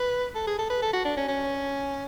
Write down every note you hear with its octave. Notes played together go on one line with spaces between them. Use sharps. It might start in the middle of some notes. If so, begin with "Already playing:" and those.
Already playing: B4
A4
G#4
A4
B4
A4
F#4
D4
C#4
C#4